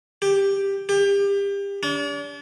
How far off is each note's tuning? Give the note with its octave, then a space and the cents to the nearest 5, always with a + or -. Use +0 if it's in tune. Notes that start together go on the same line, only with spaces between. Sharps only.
G4 +10
G4 +30
D4 -40